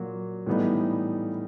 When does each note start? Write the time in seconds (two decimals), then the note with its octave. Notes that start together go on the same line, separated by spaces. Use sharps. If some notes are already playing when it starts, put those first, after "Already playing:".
Already playing: A#2 F#3 A#3
0.47 A2 E3 G3 B3 D#4